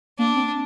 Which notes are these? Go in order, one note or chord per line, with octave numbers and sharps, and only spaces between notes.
A#3 D4
C4